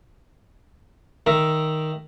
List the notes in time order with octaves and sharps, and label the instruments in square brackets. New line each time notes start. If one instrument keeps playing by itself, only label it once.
[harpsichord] D#3 A#4 E5